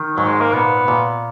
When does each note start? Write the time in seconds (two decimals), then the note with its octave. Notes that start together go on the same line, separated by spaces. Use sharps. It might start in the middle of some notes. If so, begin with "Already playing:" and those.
Already playing: D#3
0.15 G#2 F#3
0.27 G#3
0.41 A#3
0.53 A#2 B3
0.88 A#2